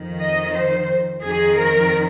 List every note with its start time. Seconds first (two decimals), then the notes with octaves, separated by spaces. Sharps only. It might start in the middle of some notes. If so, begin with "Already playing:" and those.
Already playing: F2 D#3
0.20 D#5
0.55 C5
1.23 F2 D#3 G#4
1.57 A#4